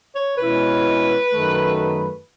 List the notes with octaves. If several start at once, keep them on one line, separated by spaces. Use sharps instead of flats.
C#5
B2 G#3 C#4 E4 B4
F#2 D#3 A3